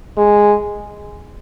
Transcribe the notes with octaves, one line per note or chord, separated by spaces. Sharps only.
G#3